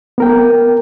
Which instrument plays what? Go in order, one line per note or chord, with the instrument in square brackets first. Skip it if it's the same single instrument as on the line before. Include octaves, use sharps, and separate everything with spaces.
[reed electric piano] B3 A#4 G5